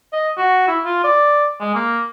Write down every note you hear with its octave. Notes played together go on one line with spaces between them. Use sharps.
D#5
F#4
E4
F4
D5
G#3
A#3